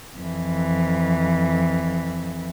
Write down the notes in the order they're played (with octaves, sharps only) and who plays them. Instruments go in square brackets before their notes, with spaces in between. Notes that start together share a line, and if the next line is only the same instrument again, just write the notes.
[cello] F2 E3